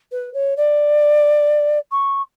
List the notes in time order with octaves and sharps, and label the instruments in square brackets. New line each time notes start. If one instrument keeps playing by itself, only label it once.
[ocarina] B4
C#5
D5
C#6